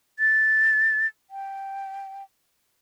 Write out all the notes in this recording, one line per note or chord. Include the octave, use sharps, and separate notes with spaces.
A6
G5